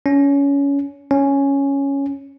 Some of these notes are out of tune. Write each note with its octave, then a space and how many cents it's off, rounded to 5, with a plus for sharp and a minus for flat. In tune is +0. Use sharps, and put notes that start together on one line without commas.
C#4 +20
C#4 +0